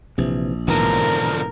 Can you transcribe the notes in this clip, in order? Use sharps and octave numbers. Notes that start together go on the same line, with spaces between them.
A#1 C3 E3
G#2 B2 D3 E3 F3 A#4